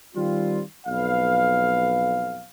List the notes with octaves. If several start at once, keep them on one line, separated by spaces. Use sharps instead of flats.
D#3 G3 C4 F4
B1 F2 B4 F5